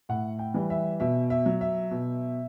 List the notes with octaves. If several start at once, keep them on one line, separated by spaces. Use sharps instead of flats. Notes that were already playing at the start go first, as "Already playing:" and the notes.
A2 F#5
G5
E3 G3
E5
B2 E5
E5
F#3
E5
B2